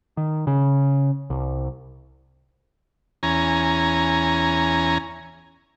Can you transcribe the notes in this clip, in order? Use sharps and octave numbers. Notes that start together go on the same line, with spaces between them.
D#3
C#3
C2
E2 C#4 G#5 A#5